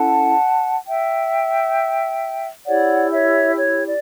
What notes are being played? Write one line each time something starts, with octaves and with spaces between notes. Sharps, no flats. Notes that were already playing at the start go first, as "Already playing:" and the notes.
Already playing: C#4 E4 A4 F#5 A5
E5 G5
E4 G4 C#5 D5 F#5
C#5 E5
C#5
D5